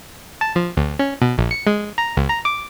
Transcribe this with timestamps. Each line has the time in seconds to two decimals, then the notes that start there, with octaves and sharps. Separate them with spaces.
0.41 A5
0.56 F3
0.77 D2
0.99 C#4
1.22 B2
1.38 A#1
1.51 C#7
1.67 G#3
1.98 A#5
2.17 C#2
2.29 A#5
2.45 D6